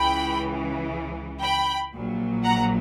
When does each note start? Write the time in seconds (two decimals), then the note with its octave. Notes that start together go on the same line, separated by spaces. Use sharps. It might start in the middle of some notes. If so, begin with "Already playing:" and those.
Already playing: C#2 C#3 E3 G5 B5
1.43 G5 B5
1.94 A#1 A#2 F#3
2.44 F#5 A#5